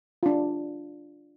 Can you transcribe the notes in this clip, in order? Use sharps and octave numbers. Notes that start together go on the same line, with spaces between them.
D4 F4